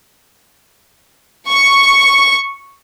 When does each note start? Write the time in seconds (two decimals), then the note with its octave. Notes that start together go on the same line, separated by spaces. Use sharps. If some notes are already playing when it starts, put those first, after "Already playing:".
1.49 C#6